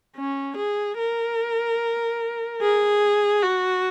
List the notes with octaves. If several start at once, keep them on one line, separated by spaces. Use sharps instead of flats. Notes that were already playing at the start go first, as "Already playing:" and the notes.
C#4
G#4
A#4
G#4
F#4